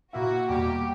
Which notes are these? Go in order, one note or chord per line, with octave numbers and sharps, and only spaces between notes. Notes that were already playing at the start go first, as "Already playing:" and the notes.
A#2 A#3 E4 F#4
E2 B2 G3 A#3 G4